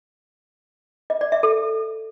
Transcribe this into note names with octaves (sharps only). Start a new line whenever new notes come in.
D#5
D5
E5
A4